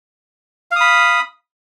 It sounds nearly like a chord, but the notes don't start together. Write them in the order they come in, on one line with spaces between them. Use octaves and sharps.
F5 D#6 B5